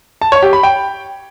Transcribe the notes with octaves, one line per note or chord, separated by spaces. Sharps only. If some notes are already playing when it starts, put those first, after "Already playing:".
A5
C#5
G4
B5
G5